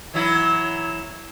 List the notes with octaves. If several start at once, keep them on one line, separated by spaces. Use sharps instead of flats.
E3 F#3 E4